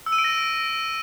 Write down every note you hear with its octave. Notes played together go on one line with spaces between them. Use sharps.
E6
D#7
D7
A#6